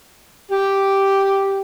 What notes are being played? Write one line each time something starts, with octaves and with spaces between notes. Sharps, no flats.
G4